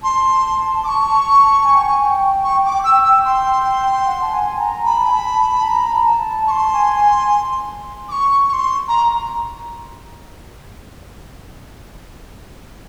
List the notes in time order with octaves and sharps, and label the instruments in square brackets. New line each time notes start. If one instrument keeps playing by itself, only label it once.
[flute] A5 [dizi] C6
[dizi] D6
C#6
[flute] G#5
G5
G#5
G5
[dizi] C#6
D6
E6
E6
C6
[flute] F#5
A5
G#5
A#5
[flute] A5 [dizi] B5
[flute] G#5
A5
A5
A#5
A5
[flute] A5 [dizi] C#6
[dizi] C6
[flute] G#5
G#5
[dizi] D6
C#6
C#6
C6
A#5